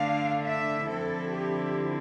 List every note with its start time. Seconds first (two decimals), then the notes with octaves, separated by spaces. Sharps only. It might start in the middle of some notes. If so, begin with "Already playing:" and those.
Already playing: D3 A3 D4 F5
0.44 E5
0.88 D3 F3 C4 E4 A4
1.32 G4